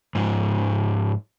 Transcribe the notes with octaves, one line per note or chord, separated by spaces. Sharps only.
G#2 F3